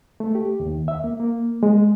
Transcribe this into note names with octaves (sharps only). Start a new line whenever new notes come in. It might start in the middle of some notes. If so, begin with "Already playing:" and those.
A3
G4
D#2
E5
A#3
A#3
G#3